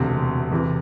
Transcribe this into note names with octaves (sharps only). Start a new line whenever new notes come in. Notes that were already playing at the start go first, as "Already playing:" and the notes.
Already playing: E1 D2 C3
E2 C3 E3